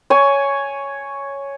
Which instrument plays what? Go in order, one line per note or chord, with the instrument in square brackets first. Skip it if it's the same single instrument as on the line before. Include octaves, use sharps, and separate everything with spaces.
[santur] C#5 G#5